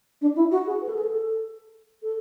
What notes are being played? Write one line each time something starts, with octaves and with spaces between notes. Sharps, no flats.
D4
E4
F#4
G#4
B4
A4
G#4
A4
A4